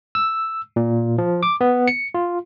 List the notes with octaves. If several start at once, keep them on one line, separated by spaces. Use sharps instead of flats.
E6
A#2
F3
D6
B3
C#7
F4